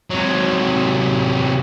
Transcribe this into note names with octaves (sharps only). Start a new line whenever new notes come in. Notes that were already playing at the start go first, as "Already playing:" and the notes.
C3 F#3